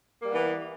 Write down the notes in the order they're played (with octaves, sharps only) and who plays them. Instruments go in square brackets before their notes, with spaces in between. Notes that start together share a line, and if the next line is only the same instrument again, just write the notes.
[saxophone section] A#3
G3
B3
E3